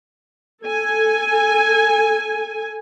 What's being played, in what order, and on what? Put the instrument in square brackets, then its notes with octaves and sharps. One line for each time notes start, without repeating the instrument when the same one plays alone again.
[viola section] A4 G#5